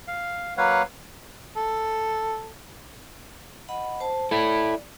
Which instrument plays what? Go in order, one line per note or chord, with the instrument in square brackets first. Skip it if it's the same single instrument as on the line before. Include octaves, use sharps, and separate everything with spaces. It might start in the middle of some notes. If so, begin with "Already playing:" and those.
[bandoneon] F5
F#3 A#3 B4 C#5 F5 F#5
[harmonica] A4
[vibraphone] D#5 F#5 B5
C5 A5
[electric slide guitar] E4 A4 [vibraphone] D5 [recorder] B5